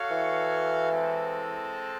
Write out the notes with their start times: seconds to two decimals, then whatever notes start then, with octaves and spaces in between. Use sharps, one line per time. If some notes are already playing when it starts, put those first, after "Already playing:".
Already playing: F#4 A4 C#5 F5
0.11 E3
0.91 G#3 C4 A4